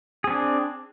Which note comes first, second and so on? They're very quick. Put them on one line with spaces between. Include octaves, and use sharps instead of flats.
G#4 C4 D4